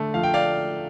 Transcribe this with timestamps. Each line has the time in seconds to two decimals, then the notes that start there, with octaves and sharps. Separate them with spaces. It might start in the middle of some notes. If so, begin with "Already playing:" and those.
Already playing: D3 A3
0.14 F3 F5
0.23 G5
0.34 D5 F5